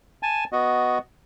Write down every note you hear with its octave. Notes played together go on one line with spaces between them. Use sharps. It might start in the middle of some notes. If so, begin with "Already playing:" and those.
G#5 A5
B3 F#4 D#5